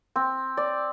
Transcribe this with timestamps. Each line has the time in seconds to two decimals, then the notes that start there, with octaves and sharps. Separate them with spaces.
0.16 C4
0.57 D5